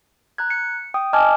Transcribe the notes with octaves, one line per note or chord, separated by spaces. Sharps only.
A#5 F#6 G#6
C#7
G5 D#6
D#5 G#5 A5 D6 F6 G#6